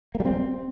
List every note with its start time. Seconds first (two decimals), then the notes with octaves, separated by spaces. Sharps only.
0.15 A#3
0.20 G3
0.25 C4